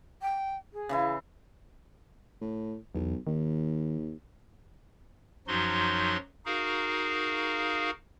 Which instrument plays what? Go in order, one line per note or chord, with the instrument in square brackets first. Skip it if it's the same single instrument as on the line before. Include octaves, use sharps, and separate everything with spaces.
[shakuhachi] G5
G#4
[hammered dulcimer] C#3 E3 E4
[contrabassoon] A2
[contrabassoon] B1 [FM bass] E2
[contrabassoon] D#2 [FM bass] D#3
[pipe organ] F#2 F3 F#3 D#4 F#4 C6
D#4 F#4 G#4 A#4 F5